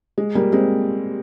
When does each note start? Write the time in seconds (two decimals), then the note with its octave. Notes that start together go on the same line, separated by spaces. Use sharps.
0.18 G#3
0.35 G3 A#3
0.52 G#3 C4